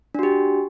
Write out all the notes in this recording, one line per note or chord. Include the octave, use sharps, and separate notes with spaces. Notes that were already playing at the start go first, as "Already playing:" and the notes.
D4 F#4 G4